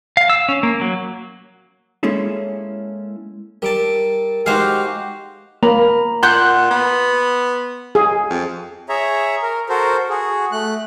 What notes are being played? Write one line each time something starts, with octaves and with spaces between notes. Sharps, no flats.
F5
E6
C#4
A#3
F#3
G#3 A#3 C#4 E4 G#4 A4
G3 A#4 A5 D7
G#3 D#4 F#4 G4 C5 F5
A#3 A#5 B5
A#2 F#5 C6 F#6 G6
B3
G#4
F2
G#4 C#5 E5 A#5
A#4
F#4 A4 A#4 C5
F#4 G#4
A3 F#6